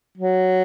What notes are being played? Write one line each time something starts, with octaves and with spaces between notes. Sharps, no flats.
F#3